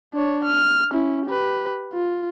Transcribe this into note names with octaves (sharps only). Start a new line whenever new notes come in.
D4 C#5
F6
C#4 E4
G4 B4
F4